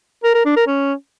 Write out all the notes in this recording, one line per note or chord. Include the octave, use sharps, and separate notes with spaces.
A#4
A#4
D4
A#4
C#4